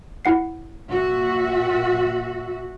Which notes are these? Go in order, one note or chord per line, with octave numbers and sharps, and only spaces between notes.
E4 F#5 C7
A#2 F#4 E5